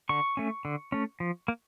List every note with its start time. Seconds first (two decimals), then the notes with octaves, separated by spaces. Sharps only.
0.09 D3 C#6
0.37 A3 C#4
0.65 D3
0.92 A3 C#4
1.20 F3
1.48 A#3